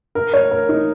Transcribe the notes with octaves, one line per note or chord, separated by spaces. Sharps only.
A#4
C#5
A#4
D#4